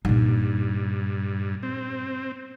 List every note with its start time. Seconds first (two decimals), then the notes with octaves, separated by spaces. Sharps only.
0.05 G2 A#2 D#4
1.63 C4